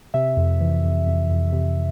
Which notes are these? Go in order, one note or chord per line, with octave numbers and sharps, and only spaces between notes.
C3 E5
F2
E3
F2
F2
F2
C3